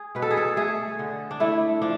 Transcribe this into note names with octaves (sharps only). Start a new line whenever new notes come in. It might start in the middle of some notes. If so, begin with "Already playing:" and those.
Already playing: G#4
B2 B4
A4
G#4
A4
A3 G#4
D3
D4
A3 E4
F3 D4